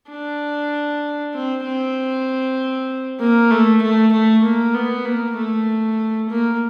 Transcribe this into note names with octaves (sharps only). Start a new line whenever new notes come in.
D4
C4
C4
A#3
A3
A3
A3
A#3
B3
A#3
A3
A#3